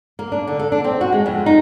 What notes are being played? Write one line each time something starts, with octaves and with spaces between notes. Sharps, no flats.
A#3
D4
D3
A4
D4
C4
F#4
G#3
F2
D#4